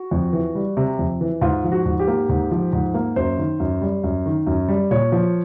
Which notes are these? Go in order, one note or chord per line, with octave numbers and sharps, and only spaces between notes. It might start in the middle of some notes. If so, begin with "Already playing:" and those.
Already playing: F#4
F2
E3
G3
C3
F2
E3
G#2 F4
F3
F#4
G#2
G4
A#3
G#2
F3
G#2
A#3
F#2 C5
D#3
F#2
G3
F#2
D#3
F#2
G3
A#2 C#5
F3